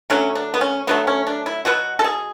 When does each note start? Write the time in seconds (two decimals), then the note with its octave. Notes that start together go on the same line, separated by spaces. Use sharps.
0.10 D3 F#3 A3 C#4
0.35 D4
0.54 B3
0.61 C#4
0.87 D3 F#3 A3 B3
1.07 C#4
1.27 D4
1.46 E4
1.65 B2 F#3 B3 F#4
1.99 A4
2.04 G#4